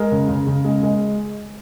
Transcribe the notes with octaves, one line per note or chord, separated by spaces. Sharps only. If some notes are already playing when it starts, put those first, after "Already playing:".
Already playing: G#3 A#4
C#3
C#3
C#3
G#3
G#3